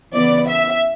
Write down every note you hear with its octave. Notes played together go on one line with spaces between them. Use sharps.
C#3 E3 B3 D5
E5